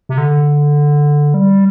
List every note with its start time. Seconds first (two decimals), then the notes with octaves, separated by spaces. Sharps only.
0.09 C3
0.18 D3
1.34 G3